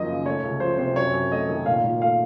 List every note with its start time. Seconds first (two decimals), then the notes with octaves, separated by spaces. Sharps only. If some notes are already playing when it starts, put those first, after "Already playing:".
Already playing: F#2 D#3 F3 A#3 D#5
0.08 C#3
0.26 A3 C#5
0.43 C#2
0.60 F3 C5
0.78 C3 C5
0.96 F#2 C#5
1.13 F#2
1.32 A3 D#5
1.49 D#3
1.66 A#2 F5
1.84 A#2
2.02 A3 F5